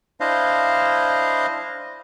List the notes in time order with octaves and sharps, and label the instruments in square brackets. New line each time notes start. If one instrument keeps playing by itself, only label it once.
[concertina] D4 E4 C5 D#5 F5